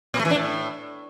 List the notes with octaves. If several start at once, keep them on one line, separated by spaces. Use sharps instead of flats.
A#2
A3
E3
D4
A2